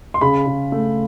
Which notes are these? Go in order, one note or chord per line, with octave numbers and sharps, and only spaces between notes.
C6
C#3 B5
C#3
A3